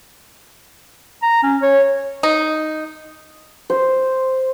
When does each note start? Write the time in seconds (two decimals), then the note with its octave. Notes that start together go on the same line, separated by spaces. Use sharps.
1.22 A#5
1.43 C#4
1.62 C#5
2.23 D#4
3.70 C5